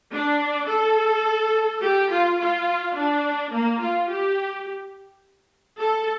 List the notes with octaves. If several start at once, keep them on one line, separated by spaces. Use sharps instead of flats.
D4
A4
G4
F4
F4
D4
A#3
F4
G4
A4